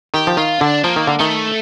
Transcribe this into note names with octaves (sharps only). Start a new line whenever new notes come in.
D#3 G4
F3
D#3 F4
D3 D4
F3 A#3
D#3
D3
D#3 A3